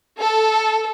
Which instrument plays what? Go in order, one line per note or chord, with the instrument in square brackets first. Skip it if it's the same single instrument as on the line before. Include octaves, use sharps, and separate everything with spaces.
[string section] A4